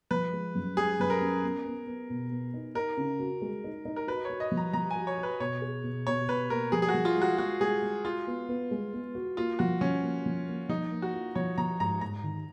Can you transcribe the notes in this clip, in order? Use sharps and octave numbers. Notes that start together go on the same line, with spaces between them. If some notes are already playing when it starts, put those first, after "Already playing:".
F3 B4
G#3
F#2
G#3 G#4
F#2 B4
A#4
C#4
B3
B3
B3
B2
B3
D#4
D#4 A#4
C#3
F#4
G#3
D#4
D#4
A#4
F#4 B4
F#4 C#5
D#5
F3
A#5
F3 A#5
F#4 G#5
C#5
F#4
B4
B2 C#5
G#4
B2
B2 C#5
B2 B4
A#3 A#4
F3 G#4
G#4
F#4
F3
F4
G#3
F#4
G#3 F#4
G#3 G#4
G#3
F4 F#4
B3
B3
G#3
B3
F#4
A#3 F4
F3 F#4
F3 C#4
A#3
F3
A#3
F3 D#4
A#3
F#4
F4
F3 C#5
F3 A#5
G#2 A#5
G#2 A#5
D#3